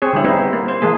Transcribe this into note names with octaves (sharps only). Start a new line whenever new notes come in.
C4 G#4 C#5
D3 G3 E4
B3 C4 D#4 E4 C5
A#3
C5
E3 G#3 A#3 G#4